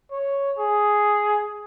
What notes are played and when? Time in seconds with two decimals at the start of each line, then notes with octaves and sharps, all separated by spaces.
0.11 C#5
0.58 G#4